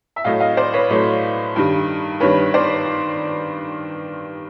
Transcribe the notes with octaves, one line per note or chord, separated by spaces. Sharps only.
E5
A2 F#3 A3 D#5 F5
D#5 F5
C5 D5
B4 C#5
A2 F#3 A3
G2 D#3 G3
G2 D#3 G3 B4 C#5
C5 D5